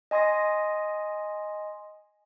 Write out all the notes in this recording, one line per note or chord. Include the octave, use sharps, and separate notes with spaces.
D#5 G#5 C6 D#6 A#6